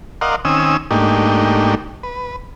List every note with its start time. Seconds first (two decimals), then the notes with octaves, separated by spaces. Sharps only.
0.21 A#4 D5 D#5 F5 F#5 C6
0.45 D#3 C4 C#4 G#5 D#6 E6
0.91 G#2 A3 A#3 D4 D#4 G4
2.03 B4